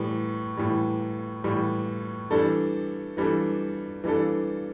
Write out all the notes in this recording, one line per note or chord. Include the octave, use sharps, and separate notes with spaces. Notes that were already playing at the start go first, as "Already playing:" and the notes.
Already playing: A2 E3 G3
A2 E3 G3
A2 E3 G3
E3 G3 D4 A4
E3 G3 D4 A4
E3 G3 D4 A4